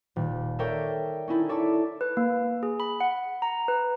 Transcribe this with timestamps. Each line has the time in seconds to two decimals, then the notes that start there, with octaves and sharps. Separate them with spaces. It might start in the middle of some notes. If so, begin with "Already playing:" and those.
0.16 D#1
0.59 A4 A#4 C#5 D5 E5 G5
1.28 C#4 D#4 E4 A4
1.49 A4 C#5 D5 E5 A5 D6
2.01 B4
2.17 A#3
2.63 G#4
2.80 B5
3.01 F#5
3.42 A#5
3.68 B4